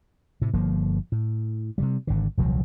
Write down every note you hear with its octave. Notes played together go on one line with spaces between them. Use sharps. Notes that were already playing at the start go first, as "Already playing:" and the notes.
A2 C3
G1 F3 A#3
A2
C3 D#3 G3
G#1 D3
D#1 C2 F3 F#3